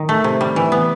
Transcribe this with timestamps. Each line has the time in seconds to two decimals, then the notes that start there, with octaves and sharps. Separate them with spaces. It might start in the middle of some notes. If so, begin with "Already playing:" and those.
Already playing: D#3
0.09 A3
0.24 C3
0.41 G3
0.56 E3
0.72 B3